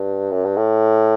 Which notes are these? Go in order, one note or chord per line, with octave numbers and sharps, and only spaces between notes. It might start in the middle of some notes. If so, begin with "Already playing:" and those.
Already playing: G2
F#2
G2
A2